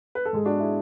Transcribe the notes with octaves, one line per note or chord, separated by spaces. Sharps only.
B4
A4
G#2 G#3 G#4
D4 F#4
E4 G#4